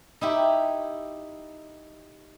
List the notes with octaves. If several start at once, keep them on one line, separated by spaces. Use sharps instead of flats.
D#4 E4 G4